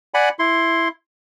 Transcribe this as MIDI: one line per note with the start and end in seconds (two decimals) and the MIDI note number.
0.14 0.29 74
0.14 0.29 78
0.14 0.29 80
0.14 0.29 83
0.39 0.88 64
0.39 0.88 84